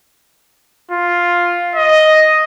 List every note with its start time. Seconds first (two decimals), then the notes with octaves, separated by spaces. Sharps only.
0.91 F4
1.76 D#5